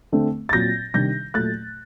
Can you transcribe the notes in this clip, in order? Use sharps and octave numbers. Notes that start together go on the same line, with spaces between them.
D3 A3 C4
A6
A#2 F#3 C4 G6 A#6
C3 D#3 G3 D4 G6 A#6
A#2 F#3 A3 F#6 A6